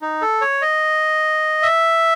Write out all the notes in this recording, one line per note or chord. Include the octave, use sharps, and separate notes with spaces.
D#4
A4
C#5
D#5
E5